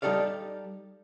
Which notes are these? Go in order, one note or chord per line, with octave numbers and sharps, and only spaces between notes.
G3 D#4 G4 A4 D5 F5